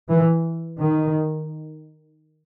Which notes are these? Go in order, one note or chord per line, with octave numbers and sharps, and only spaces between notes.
E3
D#3